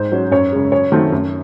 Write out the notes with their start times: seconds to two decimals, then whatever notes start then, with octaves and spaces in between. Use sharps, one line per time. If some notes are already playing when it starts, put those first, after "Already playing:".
Already playing: G#2 C5
0.12 F#3 C#4
0.31 F#2 C#5
0.52 C#3 G#3
0.72 F#2 C#5
0.92 D#3 F#3 A3 C4
1.12 F#2